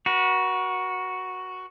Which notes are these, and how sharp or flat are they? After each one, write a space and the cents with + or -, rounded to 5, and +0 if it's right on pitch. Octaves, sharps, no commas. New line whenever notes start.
F#4 +0 B4 -45